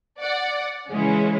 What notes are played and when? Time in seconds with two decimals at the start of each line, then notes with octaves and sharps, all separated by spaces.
0.20 D5 F#5
0.90 C#3 E3 G#3 C#4 E4